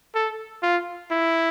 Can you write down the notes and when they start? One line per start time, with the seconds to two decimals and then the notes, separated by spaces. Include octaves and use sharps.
0.15 A4
0.63 F4
1.11 E4